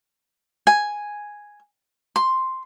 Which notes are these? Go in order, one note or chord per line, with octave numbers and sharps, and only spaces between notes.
G#5
C6